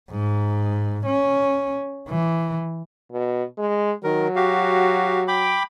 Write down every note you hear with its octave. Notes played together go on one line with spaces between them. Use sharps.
G#2
C#4
E3
B2
G#3
D#3 F#3 A#4
F#4 G4 F5
G5 B5 D6